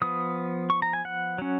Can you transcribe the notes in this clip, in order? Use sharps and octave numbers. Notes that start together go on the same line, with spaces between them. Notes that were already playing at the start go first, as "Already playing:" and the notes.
F3 B3 D#6
C#6
A#5
G#5
F#5
F#3 C#4